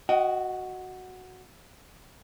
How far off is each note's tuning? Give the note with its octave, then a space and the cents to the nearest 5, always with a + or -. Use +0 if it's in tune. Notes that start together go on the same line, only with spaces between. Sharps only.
F#4 +0 D#5 +0 G5 -45